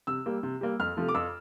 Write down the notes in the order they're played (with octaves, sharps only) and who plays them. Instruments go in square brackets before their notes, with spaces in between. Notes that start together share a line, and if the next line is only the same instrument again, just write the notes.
[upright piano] C3 E6
G3 A#3
C3
G3 A#3
F2 F6
C3 F3 A3
D6
F2 E6